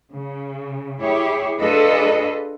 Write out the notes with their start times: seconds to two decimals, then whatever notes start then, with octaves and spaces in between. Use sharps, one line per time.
0.11 C#3
1.01 E4 G4 G#4 C#5
1.61 D4 F4 G#4 A4 B4 D#5